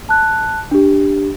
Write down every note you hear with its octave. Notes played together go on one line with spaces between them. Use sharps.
A5 F#6
D4 G4